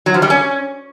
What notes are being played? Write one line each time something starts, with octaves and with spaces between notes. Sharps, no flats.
F#3
F3
G3
C#4